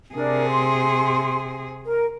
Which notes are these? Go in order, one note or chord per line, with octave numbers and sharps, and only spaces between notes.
C3 D4 G#4 A#4
C6
A#4